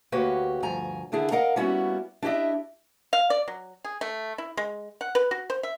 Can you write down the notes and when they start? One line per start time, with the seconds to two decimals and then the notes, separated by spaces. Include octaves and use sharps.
0.12 D2 A#3 F#4 G4 B4 C#5
0.63 D2 G2 F3 G#5 A#5
1.12 D3 D#3 D4 E4 G#4
1.31 A#4 D#5 F5 F#5 A#5
1.56 G3 A#3 B3 C#4 E4 F#4
2.22 D4 E4 G4 D#5 E5
3.13 F5
3.30 D5
3.48 F#3
3.85 G#4
4.01 A3
4.38 E4
4.57 G#3
5.01 F#5
5.15 B4
5.31 F#4
5.50 C5
5.63 E5